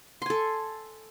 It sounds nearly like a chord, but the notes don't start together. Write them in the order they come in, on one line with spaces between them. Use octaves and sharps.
C6 G#5 A4